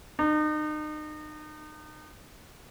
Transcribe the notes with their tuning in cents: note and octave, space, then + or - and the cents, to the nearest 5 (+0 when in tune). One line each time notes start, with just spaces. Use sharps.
D#4 -35